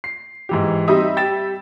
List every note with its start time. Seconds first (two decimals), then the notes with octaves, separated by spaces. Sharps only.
0.04 C7
0.49 G#2 E3 G4
0.88 G3 C4 D#4 E5 D#6
1.17 G5 A6 E7